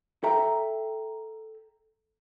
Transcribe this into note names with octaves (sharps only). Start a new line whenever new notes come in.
A4 E5 G5 A#5